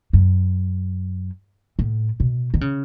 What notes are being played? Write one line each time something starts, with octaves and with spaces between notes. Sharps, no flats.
F#2
A2
B2
D#3
C#3